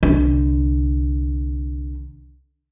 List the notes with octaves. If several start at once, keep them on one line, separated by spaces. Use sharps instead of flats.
C2 D3